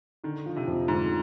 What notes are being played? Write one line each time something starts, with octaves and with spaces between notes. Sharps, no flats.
D3 D#3
F3
C3
F2
G#2 D3